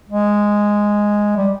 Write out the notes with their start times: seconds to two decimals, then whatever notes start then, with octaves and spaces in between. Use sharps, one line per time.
0.10 G#3
1.37 G3